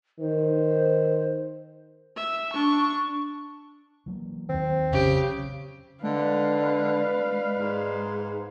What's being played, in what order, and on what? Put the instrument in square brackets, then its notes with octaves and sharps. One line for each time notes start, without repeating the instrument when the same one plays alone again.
[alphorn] D#3 [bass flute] C5
[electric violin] E5
D4 C#6
[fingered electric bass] E3 F#3 A#3
[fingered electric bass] D#2 D#3 [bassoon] C4
[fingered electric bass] A#1 F2 F#3 [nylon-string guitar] C#3 [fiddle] G4
[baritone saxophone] D3 [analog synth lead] G#3 [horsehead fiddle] B4 F5 [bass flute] D5
[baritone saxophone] G#2